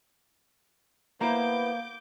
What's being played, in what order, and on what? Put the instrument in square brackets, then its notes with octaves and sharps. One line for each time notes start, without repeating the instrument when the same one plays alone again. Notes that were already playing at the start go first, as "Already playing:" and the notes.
[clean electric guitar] A#3 [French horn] B3 [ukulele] E4 C5 A#5 [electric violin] D6 G6